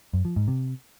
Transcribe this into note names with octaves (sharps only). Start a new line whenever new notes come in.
F#2
F3
G#2
C3